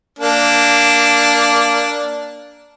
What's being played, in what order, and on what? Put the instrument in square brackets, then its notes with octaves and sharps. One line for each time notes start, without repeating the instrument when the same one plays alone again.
[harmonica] A#3 D4